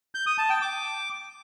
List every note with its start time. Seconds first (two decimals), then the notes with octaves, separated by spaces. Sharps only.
0.15 G6
0.26 D#6
0.38 A5
0.50 G5
0.62 D6